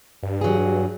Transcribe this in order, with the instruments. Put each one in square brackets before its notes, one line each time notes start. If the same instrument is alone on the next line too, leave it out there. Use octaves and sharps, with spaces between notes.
[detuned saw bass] G2
[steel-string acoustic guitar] F#3 G#4